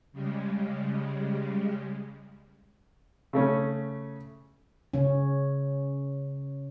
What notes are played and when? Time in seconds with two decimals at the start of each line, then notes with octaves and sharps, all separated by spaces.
0.12 C#3 G3 G#3
3.33 C#3 A3 C#4
4.93 C#3 C#4